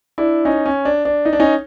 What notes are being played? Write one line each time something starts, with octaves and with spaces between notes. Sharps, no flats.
D4 E4
C#4 D#4
C#4
D4
D4
D#4
D4
C#4 D#4